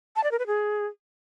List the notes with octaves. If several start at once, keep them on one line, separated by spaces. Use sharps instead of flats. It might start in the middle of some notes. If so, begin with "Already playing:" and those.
A5
D5
A#4
B4
G#4